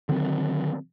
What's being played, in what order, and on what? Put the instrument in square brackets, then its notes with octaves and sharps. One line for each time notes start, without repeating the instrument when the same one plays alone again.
[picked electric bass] D3 D#3 F#3 C4